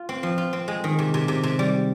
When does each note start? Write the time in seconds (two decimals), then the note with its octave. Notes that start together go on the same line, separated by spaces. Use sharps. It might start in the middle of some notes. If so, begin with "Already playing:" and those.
Already playing: F4
0.09 C4
0.23 F3
0.38 F4
0.53 C4
0.68 G#3
0.84 D#3
0.99 C3
1.14 C3
1.28 C3
1.43 C3
1.59 G3